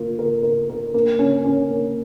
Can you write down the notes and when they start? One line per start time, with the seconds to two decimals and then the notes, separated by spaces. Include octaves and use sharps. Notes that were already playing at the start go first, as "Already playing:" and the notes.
Already playing: A#3 F4
0.19 A#4
0.43 A#4
0.69 A#4
0.94 A#3
1.19 C#4
1.45 C#4
1.70 A#3